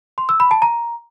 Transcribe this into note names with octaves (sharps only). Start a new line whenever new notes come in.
C6
E6
B5
A5
A#5